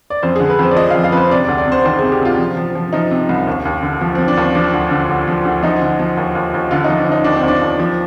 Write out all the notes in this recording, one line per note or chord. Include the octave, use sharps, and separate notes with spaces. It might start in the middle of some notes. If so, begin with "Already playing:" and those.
D5
F2 C5
G#4
D3
B4
F2 C5
D5
F3 D#5
F5
F2
F5
F2 B4 C5
C3 D5
D5
D2
D5
C3 C5
D#3 C5
G#4
C3
G4
C3 F4
F3
F3
F3
F3 D#4
C3
C2
D#2
D#2
D3
F3
C4
F3
D4
D#2 C4
F3 D4
D2
D3
D2
F3
D2
F3 D#4
D3
F3
D#2
D#2
D#2
D3 F4
D#4
F3
D4
D3 D#4
D#2 D4
C4
D#2
D4
D#2
F3